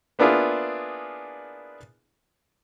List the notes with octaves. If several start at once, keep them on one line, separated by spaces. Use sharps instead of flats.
A#3 B3 D4 E4 F4 G#4